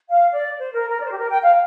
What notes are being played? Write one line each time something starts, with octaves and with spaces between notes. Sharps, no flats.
F5
D5
C5
A#4
A#4
D5
C5
G4
A#4
G5
F5